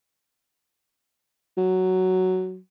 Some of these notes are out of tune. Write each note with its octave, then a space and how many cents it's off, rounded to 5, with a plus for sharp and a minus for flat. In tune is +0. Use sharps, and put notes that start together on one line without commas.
F#3 +5